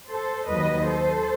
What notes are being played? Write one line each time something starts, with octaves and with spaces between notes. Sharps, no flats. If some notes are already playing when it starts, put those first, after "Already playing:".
A4 C5
D#2 D#3 F#3 B4 D#5
A4 C5